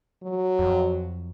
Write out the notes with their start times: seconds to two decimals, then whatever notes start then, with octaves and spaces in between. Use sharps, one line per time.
0.23 F#3
0.59 F2